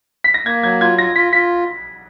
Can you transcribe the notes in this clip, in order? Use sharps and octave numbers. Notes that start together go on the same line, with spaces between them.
B6
A#6
A#3 G#6
F#3 G#6
F4 G#6
F4 A#6
F4 B6
F4 B6